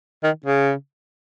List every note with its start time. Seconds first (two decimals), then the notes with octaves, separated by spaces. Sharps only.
0.24 D#3
0.46 C#3